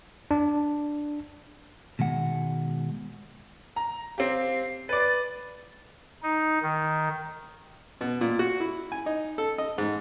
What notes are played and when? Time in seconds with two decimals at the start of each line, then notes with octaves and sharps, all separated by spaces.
0.31 D4
1.99 B2 D#3 G#3 F#5
3.76 A#5
4.18 C4 G4 F5
4.89 B4 D5 A6
6.23 D#4
6.62 D#3
8.01 B2
8.21 A#2
8.39 F#4
8.60 E4
8.92 G#5
9.06 D#4
9.38 A4
9.58 D#5
9.78 G#2